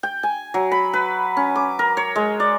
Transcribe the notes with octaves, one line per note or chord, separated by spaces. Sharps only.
G5
G#5
F#3
B5
B4
C#4
D6
A#4
C#5
G#3
D5